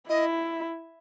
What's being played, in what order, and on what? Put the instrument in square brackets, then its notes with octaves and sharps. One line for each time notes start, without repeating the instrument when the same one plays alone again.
[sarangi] E4 [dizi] D#5